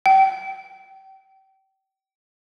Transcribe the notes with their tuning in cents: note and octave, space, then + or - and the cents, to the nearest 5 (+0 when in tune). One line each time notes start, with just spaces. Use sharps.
G5 -30